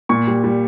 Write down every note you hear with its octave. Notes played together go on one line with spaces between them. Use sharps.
A#2 C#6
G3
G3